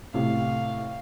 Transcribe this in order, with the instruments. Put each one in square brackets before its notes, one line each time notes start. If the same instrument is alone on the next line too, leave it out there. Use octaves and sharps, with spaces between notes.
[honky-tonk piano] A2 C3 [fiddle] F5